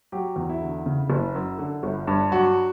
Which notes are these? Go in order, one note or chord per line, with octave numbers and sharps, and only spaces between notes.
F#3 G4
E2
E4
D3
C#3
F#1
F#2
D3
G1
G2
F#3 F#4